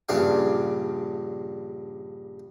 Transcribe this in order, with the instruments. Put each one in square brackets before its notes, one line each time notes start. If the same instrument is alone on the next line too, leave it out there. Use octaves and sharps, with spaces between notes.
[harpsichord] A#1 G2 C#3 C#4 D4 F5